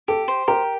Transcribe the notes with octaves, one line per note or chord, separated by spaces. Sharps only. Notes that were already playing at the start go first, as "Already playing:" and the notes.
G4 A4
C5
G4 A#4